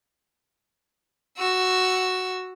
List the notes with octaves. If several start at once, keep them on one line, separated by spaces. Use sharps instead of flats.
F#4 E6